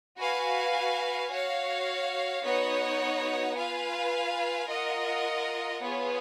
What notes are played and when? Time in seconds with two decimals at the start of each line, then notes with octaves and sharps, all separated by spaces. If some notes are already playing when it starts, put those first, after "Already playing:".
0.17 F#4 B4 F5 G#5
1.30 F#4 C#5 F5
2.43 B3 D#4 F#4 C#5 F#5
3.56 F4 B4 F5 G#5
4.68 F4 A#4 D#5 F#5
5.80 B3 F4 G#4 C#5